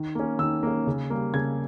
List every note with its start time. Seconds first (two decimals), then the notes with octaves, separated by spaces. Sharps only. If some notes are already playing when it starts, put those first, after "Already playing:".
Already playing: D#3
0.15 A#3 C#4
0.39 D#3 E6
0.63 A#3 C#4
0.87 C#3
1.10 G3 A#3
1.34 C#3 G#6